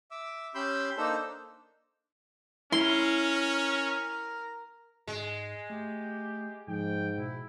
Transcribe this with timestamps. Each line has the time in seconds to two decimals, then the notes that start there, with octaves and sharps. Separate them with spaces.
0.11 E5 D6 E6
0.55 C#4 G4 B5 C6 E6 G6
0.97 A#3 D4 D#4 A4 C5 E6
2.72 C#4 E4 A#4 C6
5.07 G#2 G#3
5.70 A3 G4
6.68 G#2 F3 G5
7.18 B2 E4